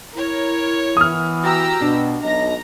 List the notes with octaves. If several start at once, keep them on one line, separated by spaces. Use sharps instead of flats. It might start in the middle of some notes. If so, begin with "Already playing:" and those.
E4 A#4 C#5
E3 B3 D#6 F6
F#4 G4 A#5 E6
B2 D4
B1 D#5 A#5 A#6